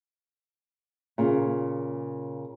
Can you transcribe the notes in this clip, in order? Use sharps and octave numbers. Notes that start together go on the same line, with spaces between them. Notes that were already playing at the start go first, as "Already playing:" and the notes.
A#2 C#3